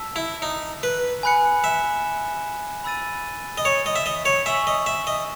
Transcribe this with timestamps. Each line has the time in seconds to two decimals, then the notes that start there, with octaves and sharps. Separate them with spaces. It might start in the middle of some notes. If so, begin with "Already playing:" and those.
Already playing: A5 E6 B6
0.16 E4
0.42 D#4
0.83 B4
1.23 G#5 B5 F#6 C#7
1.64 E5
2.84 B5 E6 A6 D#7
3.58 D#5
3.65 C#5
3.86 D#5
3.96 E5
4.06 D#5
4.25 C#5
4.46 E5 G#5 C#6 E6 B6 F#7
4.67 D#5
4.86 E5
5.07 D#5